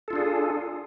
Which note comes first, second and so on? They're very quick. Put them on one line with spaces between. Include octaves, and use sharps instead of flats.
A4 F4 D4 G#4